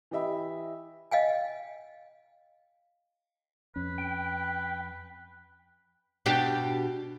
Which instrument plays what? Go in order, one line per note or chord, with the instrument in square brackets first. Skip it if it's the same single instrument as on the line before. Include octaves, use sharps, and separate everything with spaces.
[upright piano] E3 G4 D#5 E5 B5
[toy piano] D#5 F5 G5 G#5
[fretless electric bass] F2 C#4 [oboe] B4
[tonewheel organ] G5
[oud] B2 D4 G4